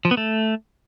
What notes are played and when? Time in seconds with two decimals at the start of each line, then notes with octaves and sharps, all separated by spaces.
0.05 F3
0.11 B3
0.17 A3